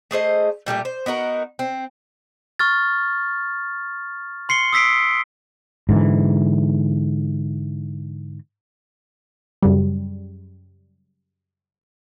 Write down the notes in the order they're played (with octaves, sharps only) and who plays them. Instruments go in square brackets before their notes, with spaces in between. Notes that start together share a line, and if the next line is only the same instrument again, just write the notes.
[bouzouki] A3 G#4 C5 D#5
A#2 G3 A3 G4
C5
B3 D#4 F#4 A#4
C4
[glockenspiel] C#6 F6 A6
C6 C7 C#7 G7
D#6 E6 B6 C7 D7
[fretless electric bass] G#2 D3 E3
[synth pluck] F#2 C#3 G3